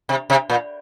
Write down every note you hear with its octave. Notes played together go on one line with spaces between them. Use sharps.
C3
C3
A#2